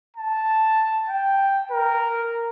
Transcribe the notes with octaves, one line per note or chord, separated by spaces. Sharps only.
A5
G5
A#4